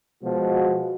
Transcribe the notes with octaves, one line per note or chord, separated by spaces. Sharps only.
B2 F3 G#3 F#4